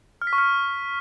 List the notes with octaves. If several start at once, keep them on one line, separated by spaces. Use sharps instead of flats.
F6
B6
C#6
F6